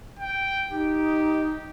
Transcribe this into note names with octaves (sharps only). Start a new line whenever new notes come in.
G5
D#4 G4